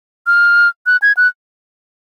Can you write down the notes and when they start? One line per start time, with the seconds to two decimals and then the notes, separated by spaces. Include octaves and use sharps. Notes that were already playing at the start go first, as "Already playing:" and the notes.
0.27 F6
0.86 F#6
1.02 G#6
1.17 F#6